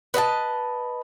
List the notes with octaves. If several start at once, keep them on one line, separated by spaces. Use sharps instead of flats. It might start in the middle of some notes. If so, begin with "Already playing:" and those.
B4 D#5 F5 A5